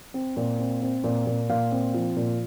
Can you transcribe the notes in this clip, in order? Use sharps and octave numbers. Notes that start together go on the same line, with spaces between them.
C4
A#2
C4
C4
A#2
A#2
A#2 F5
C4
F3
A#2